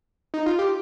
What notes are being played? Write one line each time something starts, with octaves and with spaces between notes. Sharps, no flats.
D#4
F4
G4